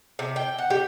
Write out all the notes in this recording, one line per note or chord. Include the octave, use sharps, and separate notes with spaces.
C3
G5
F#5
G4